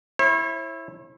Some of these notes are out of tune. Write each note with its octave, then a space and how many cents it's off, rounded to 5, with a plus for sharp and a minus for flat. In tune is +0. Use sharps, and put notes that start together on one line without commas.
E4 +0 C#5 -45